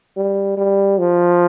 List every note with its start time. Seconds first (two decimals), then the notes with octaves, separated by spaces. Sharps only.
0.17 G3
0.57 G3
0.99 F3